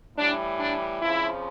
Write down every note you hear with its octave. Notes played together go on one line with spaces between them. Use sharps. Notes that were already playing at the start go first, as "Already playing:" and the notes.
A2 E3 G3 D4
D4
F2 C#3 F3 E4